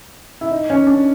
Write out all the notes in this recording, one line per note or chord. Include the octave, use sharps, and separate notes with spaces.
E4
D#4
C#4
D4